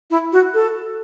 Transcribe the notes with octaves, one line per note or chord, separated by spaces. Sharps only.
E4
F#4
A4